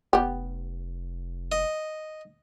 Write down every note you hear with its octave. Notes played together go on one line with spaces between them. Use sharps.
F1 B3 G4
D#5